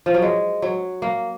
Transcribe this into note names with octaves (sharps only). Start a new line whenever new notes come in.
F3
F#3
G#3
F#3
A#3